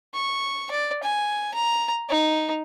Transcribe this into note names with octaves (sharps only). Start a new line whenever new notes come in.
C#6
D5
G#5
A#5
D#4